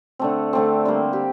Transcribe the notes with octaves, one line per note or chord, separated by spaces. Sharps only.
D3 A3 C4
D3 A3 C4 D5
D3 G3 A#3 C5
G4